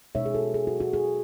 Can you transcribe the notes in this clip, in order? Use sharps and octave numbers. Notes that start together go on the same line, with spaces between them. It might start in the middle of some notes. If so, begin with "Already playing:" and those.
B2 G#3 D#4 C#5 E5
G#4
F#4 A4
G#4
F#4
F#4
G#4